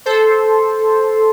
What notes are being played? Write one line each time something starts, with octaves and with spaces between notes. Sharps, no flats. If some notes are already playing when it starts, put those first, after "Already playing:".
A4 C5